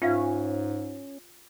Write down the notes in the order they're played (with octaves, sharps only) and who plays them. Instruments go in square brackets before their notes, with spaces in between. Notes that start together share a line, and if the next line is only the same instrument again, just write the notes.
[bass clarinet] G#2 [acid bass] C#4 [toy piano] F4 E5 F5